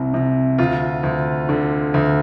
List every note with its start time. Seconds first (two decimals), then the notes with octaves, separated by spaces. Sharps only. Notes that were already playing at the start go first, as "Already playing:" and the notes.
Already playing: C2 C3
0.14 C3
0.58 D2 F4
1.03 D2
1.49 D3
1.94 D2